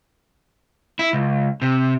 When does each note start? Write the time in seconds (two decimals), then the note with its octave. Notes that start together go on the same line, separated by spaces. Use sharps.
0.99 E4
1.13 C#2
1.62 C3